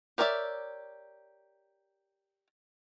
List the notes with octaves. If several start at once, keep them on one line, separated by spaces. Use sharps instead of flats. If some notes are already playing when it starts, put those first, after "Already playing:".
G4 A#4 C#5 D5 E5